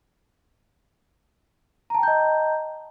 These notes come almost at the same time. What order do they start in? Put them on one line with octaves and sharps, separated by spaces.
A#5 A5 G5 G6 D#5